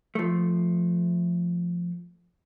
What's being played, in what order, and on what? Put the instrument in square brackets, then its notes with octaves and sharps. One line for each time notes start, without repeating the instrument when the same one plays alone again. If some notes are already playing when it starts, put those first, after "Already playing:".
[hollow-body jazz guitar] F3 A3